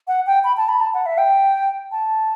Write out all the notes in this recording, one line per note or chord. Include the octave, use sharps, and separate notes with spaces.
F#5
G5
B5
A5
B5
A5
F#5
E5
G5
A5